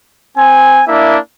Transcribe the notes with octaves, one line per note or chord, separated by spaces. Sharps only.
C4 G#5
A#3 D4 E4 E5